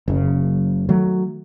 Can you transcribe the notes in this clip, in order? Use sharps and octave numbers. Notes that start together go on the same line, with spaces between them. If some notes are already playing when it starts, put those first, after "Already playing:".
F#1 F#2 C#3
D#3 F#3 A3